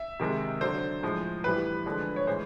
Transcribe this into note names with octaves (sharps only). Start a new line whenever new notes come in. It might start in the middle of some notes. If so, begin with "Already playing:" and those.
Already playing: E5
C3 D#3 G#3
D3 F#3 C5
A2 F3 G#3
A2 E3 G3 B4
D3 F3 G#3
C#5
A2 E3 G#3 C5